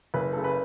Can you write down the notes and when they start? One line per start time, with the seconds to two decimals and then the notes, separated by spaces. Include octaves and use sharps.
0.14 F#1 B4
0.33 C#3 A4
0.44 B4